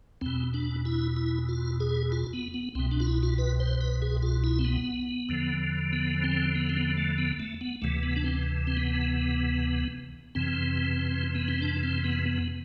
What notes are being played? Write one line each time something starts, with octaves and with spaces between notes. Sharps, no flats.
E2 B2 C4
D4
E4
E4
F4
G#4
F4
B3
B3
C2 B2 C4
D4
F4
E4
F4
B4
C5
B4
G#4
F4
E4
C4
B3
E2 D3 F3
B3
C4
B3
C4
B3
A3
B3
A3
B3
D2 C3 E3 A3
B3
D4
C4
C4
B3
F2 C3 E3 C4
B3
C4
D4
C4
B3
B3